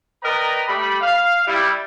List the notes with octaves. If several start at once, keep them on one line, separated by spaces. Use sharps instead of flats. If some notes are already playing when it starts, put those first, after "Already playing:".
A#4 B4 D5 D#5 G5 A#5
G3 A3 B5
F5
G3 E4